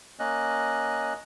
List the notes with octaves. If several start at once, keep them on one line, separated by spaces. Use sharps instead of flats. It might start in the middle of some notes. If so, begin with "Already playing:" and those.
A#3 C#4 D#5 F#6